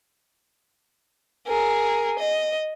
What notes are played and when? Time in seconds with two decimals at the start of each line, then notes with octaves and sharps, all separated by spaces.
1.47 G#4 A#4
2.19 D#5